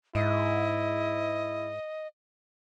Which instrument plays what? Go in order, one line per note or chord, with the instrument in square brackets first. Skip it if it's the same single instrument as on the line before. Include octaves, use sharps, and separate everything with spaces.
[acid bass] G#2 [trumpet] E4 [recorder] D#5